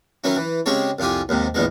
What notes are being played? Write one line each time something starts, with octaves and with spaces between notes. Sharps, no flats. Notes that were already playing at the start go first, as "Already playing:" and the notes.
D#3 F#3 C#4 E4
E3
C#3 G#3 C4 G4 C#5
C2 F2 F4 G4 G#5
D#2 G#2 C3
A#1 E2 A#2 D#3 G#3